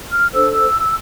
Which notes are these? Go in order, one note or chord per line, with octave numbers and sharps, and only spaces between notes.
F6
D4 A4 C5 E6